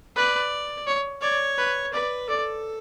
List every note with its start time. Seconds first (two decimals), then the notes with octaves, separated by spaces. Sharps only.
0.16 B4 D5
0.87 C#5
1.22 C#5 D5
1.58 B4
1.94 B4 D5
2.28 A4 D5